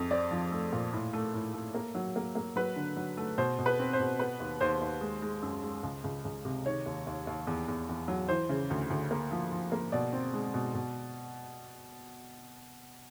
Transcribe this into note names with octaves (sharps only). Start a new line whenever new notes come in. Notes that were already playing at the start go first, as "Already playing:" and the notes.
Already playing: F2
C4 D5
F3
A3
A#2
A2
A3
A2
A3
A#3
F#3
A#3
A#3
F#3 B4
D3
F#3
A3
B2 C5
B2
B4
C4
C5
B2
B3 B4
D#2
D#2 C5
D#2
G#3
G#3
F#2
G#3
C#2
C#2
C#2
C3
D#3 C#5
D#2
D#2
D#2
E2
E2
E2
F#3
E3 C5
C#3
D2
D2
A#3
F3
F3
A#3
B2 D5
C4
G#3
B2
B2